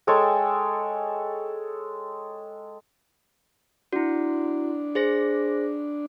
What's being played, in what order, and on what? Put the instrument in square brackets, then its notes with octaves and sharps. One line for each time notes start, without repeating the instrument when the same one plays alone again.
[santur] G#3 A4 C#5 G5
[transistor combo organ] D4 [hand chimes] E4 F#4
[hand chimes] G#4 C5 A#6